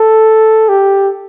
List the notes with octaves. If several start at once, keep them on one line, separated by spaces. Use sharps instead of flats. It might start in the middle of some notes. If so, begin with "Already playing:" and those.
Already playing: A4
G4